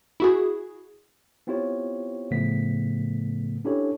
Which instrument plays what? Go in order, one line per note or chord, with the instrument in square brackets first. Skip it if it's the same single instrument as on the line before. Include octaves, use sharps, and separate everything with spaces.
[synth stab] E4 F#4 G#4
[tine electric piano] B3 C4 E4 F4 G4 C#5
A2 C#3 F3 A3 B3 B6
C#4 D4 E4 G4 A4 C#5